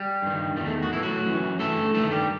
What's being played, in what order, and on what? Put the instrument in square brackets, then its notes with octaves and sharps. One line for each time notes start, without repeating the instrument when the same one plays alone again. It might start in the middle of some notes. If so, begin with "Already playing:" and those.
Already playing: [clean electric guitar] G3
G2 D#3
E2 D#3 G3
A3
F#4
A2 E3 E4
F#3 F#4
F#2 E3
G2 E3 A3 A4
G2 D#3 A3 A4
G3 G4